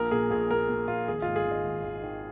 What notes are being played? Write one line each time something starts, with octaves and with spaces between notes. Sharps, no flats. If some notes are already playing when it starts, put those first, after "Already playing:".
Already playing: A#1 A#4
A#2 G#4
A#1 G#4
A#2 A#4
A#2
A#1 F4
G#1 G#4
G#2 F4
G#4
G#1 D#5
G#1
G#1
D#3